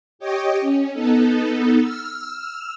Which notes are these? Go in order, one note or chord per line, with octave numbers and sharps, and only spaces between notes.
G4 C#5 D#5 G5
C#4
B3 D#4 A4
E6 F6